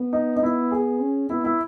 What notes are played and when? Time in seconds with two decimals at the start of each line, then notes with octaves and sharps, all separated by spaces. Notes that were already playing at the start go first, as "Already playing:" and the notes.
Already playing: B3
0.13 D#4
0.36 D#4
0.42 B3 E4
0.71 G#4
1.00 C#4
1.30 B3 E4
1.44 E4